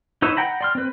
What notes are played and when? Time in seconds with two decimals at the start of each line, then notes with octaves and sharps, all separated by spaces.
0.22 D#4 E4 B4 C#5 E5
0.37 F#5 G5 A#5 B5
0.61 D5 C6 F6
0.75 C4 B4